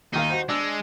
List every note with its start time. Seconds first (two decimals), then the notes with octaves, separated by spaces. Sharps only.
0.14 D#2 D#3 D#4 F5
0.29 F#4 C5
0.49 G#3 D4 E6